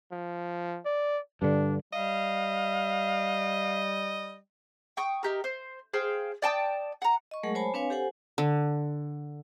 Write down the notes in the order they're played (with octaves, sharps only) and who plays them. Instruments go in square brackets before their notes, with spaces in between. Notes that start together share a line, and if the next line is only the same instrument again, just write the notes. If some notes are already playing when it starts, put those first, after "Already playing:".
[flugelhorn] F3
D5
[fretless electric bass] G2 D3 [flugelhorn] D4
[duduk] G3 [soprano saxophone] D#5 [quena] F5
[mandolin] G5 C#6 D#6
D#4 G4 A#4
C5
G#4 C5 F5 G5
D5 G5 A5 D#6
F#5 A#5
[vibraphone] D#5 C#6
F#3 G#3 A3 G#4 A#4 F#5
C5 C#5 G#5 A5 B5
C4 D4 B4 C#5 F5 G#5
G4 A4 C5 F#5 G#5
[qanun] D3